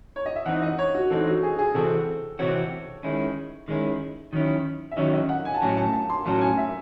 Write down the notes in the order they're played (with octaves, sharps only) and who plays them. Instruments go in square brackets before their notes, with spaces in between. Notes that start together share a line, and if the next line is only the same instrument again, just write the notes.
[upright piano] C#5
D#5
E5
[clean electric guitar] E3 C4 D#4 [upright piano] F#5
[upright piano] D#5
C#5
F#4
[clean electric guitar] E3 C4 D#4 [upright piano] A4
[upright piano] F#4
G#4
G#4
[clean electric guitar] C3 E3 C4 F#4 [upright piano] A4
[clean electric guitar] C3 E3 C4 F#4 [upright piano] C#5
[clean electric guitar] D#3 G#3 C#4 E4
D#3 G#3 C#4 E4
D#3 F#3 C#4 E4
[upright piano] E5
[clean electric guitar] D#3 F#3 C#4 E4 [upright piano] D#5
[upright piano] D#5
F#5
G#5
A5
[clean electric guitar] A2 F#3 C#4 F#4 [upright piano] G#5
[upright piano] A5
A5
C6
[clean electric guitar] A2 F#3 C#4 F#4 [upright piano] A5
[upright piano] G#5
E5